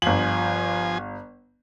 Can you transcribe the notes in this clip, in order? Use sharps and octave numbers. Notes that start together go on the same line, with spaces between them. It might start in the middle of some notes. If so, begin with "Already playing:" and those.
G1 F3 G#5 F#7